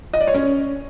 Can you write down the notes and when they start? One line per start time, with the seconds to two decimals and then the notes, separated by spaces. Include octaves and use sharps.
0.13 D#5
0.20 D5
0.27 C#5
0.34 C#4